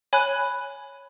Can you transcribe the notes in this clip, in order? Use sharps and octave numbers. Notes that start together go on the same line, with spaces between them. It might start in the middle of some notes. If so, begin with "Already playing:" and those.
C#5 G#5 B5 F#6